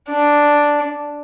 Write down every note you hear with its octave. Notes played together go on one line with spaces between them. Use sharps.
D4